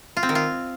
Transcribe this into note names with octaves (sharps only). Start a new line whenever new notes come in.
F4
C4
D#3
F4